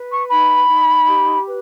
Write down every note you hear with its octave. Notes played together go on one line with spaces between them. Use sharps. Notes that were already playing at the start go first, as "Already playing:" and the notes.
Already playing: B4
C#6
D#4 B5
D#4
G4
B4